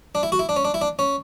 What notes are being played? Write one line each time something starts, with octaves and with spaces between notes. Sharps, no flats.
D4
E4
F#4
E4
D4
C#4
D4
E4
D4
C#4